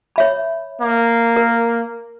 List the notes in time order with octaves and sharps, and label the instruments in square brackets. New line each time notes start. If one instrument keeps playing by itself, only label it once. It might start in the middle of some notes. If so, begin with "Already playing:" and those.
[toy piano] C#5 E5 B5
[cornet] A#3
[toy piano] A#4